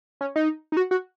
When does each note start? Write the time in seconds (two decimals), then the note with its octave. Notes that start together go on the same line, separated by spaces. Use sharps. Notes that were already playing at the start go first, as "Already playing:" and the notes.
0.21 C#4
0.36 D#4
0.72 D#4
0.77 F#4
0.91 F#4